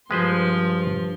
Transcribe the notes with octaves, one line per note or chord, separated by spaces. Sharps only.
G2 F3 G#3 B4 C5 C6